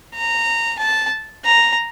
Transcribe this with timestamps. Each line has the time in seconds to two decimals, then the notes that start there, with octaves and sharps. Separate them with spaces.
0.15 A#5
0.79 A5
1.45 A#5